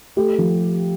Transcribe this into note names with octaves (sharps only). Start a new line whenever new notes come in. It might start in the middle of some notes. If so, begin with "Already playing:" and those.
A3 G4
F3